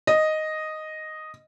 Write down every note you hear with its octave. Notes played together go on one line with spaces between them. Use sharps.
D#5